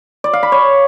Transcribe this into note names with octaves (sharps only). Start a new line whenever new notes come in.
D5
F5
B5
C#5